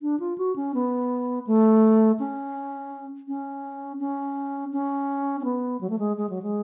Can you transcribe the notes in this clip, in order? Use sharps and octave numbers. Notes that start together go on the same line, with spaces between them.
D4
F4
F#4
C#4
B3
A3
C#4
C#4
C#4
C#4
C#4
B3
F#3
A3
G#3
G#3
F#3
G#3